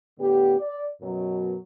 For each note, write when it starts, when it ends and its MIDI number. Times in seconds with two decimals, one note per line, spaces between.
0.19 0.56 45
0.19 0.56 50
0.19 0.56 59
0.19 0.56 67
0.60 0.86 74
1.01 1.56 42
1.01 1.56 47
1.01 1.56 54